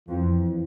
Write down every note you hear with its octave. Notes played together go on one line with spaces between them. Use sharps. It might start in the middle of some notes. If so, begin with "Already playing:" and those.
F2 E3